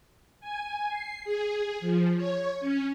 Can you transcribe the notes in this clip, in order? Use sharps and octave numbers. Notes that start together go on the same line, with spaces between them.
G#5
C7
G#4
F3
C#5
C#4